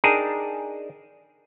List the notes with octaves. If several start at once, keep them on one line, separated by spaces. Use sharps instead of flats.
D4 D#4 G#4 A#4 G5 A5